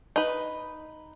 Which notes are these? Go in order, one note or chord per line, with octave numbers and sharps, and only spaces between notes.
D#4 B4